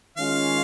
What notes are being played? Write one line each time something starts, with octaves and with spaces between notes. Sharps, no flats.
D#3 G#3 C#4 F4 F5